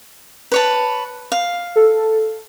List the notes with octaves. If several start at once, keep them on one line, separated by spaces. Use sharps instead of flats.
B4 C#5 A5
F5
A4